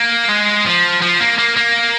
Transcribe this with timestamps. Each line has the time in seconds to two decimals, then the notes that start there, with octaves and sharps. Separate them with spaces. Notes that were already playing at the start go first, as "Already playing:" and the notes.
Already playing: A#3
0.29 G#3
0.65 F3
1.02 F3
1.20 A#3
1.39 A#3
1.57 A#3